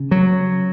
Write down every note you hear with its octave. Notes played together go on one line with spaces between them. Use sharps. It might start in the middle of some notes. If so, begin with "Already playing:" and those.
Already playing: C#3
F#3